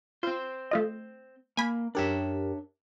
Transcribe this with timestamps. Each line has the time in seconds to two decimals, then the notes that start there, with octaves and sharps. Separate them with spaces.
0.23 C4 F4 C5
0.71 A3 F4 D#5
1.57 A#3 G#5 B5
1.95 F#2 D4 G4 A#4 C#5 E5